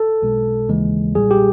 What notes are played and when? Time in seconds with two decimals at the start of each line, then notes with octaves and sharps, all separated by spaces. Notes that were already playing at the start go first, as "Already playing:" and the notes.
Already playing: A4
0.22 B1 B2 G#3
0.69 D#2 C#3 E3 G#3
1.15 B1 A#2 G3 G#4
1.31 G4